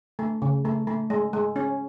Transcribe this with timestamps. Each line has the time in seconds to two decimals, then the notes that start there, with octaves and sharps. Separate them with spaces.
0.19 A3
0.42 C#3
0.65 A3
0.87 A3
1.10 G#3
1.33 G#3
1.56 C#4